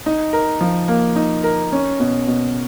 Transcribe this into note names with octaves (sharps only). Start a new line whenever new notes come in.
D#4
A#4
F3
A#3
D#4
A#4
C#4
B2
B2